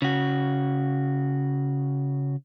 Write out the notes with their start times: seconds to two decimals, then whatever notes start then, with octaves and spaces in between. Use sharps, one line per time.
0.02 C#3 F#4